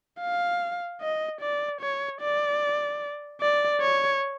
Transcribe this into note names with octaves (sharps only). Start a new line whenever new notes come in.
F5
D#5
D5
C#5
D5
D5
C#5